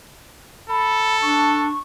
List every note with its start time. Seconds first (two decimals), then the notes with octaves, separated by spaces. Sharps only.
0.69 A4 B5
1.22 D4 C#6